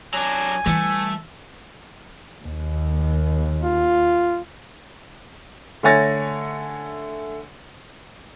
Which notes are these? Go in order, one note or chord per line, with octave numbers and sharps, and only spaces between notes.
F#3 D4 G#5
E3 G3 A3
D#2
F4
D3 A3 C#5 G#5 A6 A#6